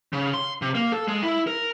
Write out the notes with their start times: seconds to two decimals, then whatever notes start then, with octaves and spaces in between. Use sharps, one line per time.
0.13 C#3
0.34 C6
0.62 C3
0.75 A#3
0.92 A4
1.08 G#3
1.23 E4
1.47 A#4